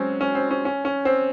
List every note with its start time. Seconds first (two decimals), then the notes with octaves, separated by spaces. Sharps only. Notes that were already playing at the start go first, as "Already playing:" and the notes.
Already playing: F#3 G#3 C4 C#4
0.21 C#4
0.35 C4
0.51 C#4
0.65 C#4
0.85 C#4
1.05 C4